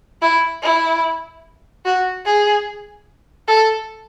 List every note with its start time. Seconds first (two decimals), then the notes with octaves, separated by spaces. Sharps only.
0.22 E4
0.63 E4
1.85 F#4
2.26 G#4
3.48 A4